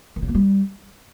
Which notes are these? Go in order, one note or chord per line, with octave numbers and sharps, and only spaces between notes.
D#3
C#3
A#3
G3